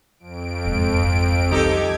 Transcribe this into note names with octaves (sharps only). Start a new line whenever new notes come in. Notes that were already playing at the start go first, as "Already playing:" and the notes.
F2 D7
E1 G#2
G#1
C2 E3 D#4 G4 A4 G#6